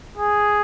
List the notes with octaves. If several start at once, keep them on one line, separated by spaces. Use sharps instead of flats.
G#4